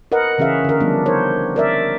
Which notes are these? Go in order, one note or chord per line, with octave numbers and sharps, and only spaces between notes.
A#4 B4 D#5 F#5
C#3 E3 C#4 G#4 E5 F5
D3 A#4
D3 F3 G3 B3 D4
D#4 A#4 C5 C#5
A#4 D5 E5